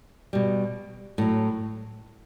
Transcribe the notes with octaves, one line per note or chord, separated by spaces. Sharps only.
B2 G3
A2 F#3